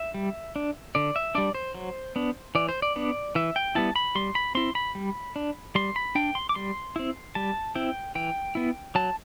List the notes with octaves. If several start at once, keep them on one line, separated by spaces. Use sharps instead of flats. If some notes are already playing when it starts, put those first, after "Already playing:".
Already playing: E5
G3
D4
D3 D5
E5
G3 D4 D5
C5
F#3
B3 D4
E3 D5
C5
D5
B3 D4
E3 E5
G5
G3 B3 E4 A5
B5
G3 C6
B5
C4 E4 C6
B5
G3
D4
G3 C6
B5
D4 G5
C6
D6
G3 C6
C4 E4
G3 A5
C4 E4 G5
E3 G5
B3 E4
F#3 A5